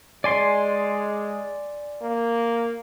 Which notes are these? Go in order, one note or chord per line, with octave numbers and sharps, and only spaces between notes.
G#3 D5 G#5 C6
A#3